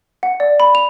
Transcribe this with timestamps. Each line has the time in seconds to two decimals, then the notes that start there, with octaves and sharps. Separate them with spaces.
0.23 F#5
0.40 D5
0.60 B5
0.75 F7